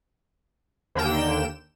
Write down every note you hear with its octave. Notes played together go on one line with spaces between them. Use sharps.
D#2 D3 A#3 G5 E7